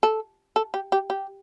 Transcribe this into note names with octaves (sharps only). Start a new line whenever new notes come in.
A4
A4
G4
G4
G4